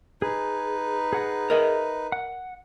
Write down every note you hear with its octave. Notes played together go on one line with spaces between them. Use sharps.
D#4 G#4 B4
G#4 F#5 A#5
A#4 D#5 E5
F#5